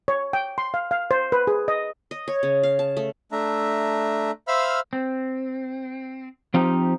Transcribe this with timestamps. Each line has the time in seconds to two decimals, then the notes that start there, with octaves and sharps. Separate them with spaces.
0.08 C#5
0.33 G5
0.58 C6
0.74 F5
0.91 F5
1.11 C5
1.32 B4
1.47 G#4
1.68 D#5
2.11 D#5
2.28 C#5
2.43 C#3
2.63 F5
2.79 A5
2.97 A3
3.32 A3 D4 E5 A#5
4.48 C5 E5 F5 B5 E6 F6
4.93 C4
6.54 F3 C4 D#4 F4 G4